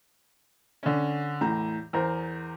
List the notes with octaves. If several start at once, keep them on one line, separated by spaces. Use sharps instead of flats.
D3 C#4
E2 A2 A#5
E2 A#4 C5